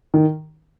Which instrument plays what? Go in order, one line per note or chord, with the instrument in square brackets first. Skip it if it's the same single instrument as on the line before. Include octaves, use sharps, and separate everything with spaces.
[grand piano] D#3